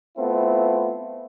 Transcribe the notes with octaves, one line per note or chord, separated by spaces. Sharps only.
A3 B3 C4 E4 F4